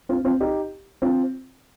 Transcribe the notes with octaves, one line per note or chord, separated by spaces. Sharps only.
C4 F4
C4 F4
D#4 G4
C4 F4